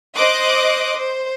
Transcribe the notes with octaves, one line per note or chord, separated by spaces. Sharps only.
C5 D#5 C6 D6 D#6 F#6
C5